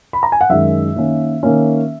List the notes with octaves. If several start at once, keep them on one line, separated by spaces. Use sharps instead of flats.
B5
A#5
G#5
F#5
F#2 D#3 G#3 E5
D#3 A#3 C#4
D#3 A#3 C#4